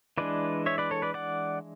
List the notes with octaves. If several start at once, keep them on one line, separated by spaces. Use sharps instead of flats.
E3 G#3 D4 B4 D5
C#5 E5
B4 D5
A4 C#5
B4 D5
D5 F#5